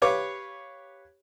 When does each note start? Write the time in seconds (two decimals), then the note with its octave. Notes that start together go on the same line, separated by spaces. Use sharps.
0.02 G4 B4 C#5 F5 D6